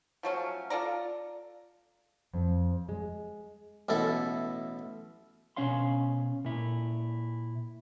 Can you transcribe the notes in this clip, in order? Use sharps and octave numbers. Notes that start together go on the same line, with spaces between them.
F3 F#3 A3 C#4
F4 A4 D5 A#5
F2
G#3
A1 B2 E4 A4
B2 C#4 C#5 F5 C6
A#2 E4